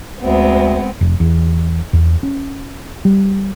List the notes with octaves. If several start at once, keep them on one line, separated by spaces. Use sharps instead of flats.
D2 G#3 B3 C4
F1
E2
E2
C#4
G3